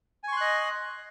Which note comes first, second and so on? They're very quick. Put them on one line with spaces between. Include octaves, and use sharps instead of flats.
G#5 C#6 C6 F#6 D#5